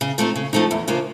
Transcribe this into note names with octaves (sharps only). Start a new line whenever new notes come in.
C#3
F3 A3 C4 D#4
C#3
F3 A3 C4 D#4
E2
C#3 F3 A#3 D4